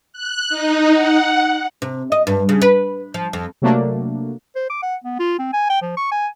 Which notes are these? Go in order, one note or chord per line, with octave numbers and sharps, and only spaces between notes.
F#6
D#4
F#5
C3
D#5
G2
C#3
B4
F3
F2
C3 F#3 A3 A#3 D4
C5
D6
F#5
B3
F4
C4
G#5
G5
F3
C#6
G#5